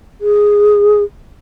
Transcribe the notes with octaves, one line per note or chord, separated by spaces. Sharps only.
G#4